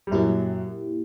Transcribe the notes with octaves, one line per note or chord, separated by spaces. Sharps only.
G3
F#2 A#2 F#3 A#3 E4 G4